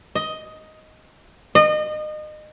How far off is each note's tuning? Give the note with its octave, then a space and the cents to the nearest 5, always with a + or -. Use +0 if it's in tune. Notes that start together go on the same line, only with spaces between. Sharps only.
D#5 +10
D#5 -30